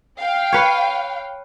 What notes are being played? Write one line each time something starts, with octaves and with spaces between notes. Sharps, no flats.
F5 G5
B4 C#5